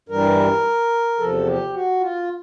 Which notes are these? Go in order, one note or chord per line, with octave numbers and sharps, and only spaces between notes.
G2 E3 G3 A#4
E2 C3 F3 A4
G4
F#4
F4